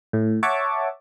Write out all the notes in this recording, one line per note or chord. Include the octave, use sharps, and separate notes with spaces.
A2
C#5 E5 F#5 A5 C#6 D6